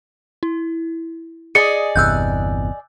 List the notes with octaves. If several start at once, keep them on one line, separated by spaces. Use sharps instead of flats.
E4
G#4 D5 D#5 C#7
G1 E2 C3 E6 F#6 G6